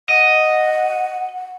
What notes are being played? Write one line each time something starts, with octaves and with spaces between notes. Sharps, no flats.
D#5 F#5